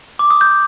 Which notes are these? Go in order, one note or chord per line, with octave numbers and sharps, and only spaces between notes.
D6
D#6
G6